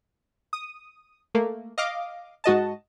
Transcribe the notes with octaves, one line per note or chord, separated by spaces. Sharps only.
D#6
A3 A#3
D#5 F5 D6
G#2 F#4 D#5 A5